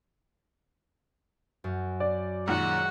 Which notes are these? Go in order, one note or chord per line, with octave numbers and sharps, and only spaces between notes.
F#2
D5
F#2 A#2 D#3 G#3 F#4 F#5